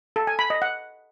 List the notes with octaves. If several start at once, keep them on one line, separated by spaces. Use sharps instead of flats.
A4
G#5
B5
D#5
F#5